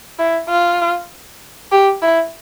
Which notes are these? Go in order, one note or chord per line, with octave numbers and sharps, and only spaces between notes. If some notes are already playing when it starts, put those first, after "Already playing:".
E4
F4
G4
E4